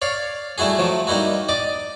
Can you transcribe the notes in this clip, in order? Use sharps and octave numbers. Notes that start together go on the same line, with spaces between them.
C#5 D5 F5
G3 A3 E4 F#4 G#4
F3 F#3 A3
G3 A#3 D#4 E4 F#4
D5 D#5 D6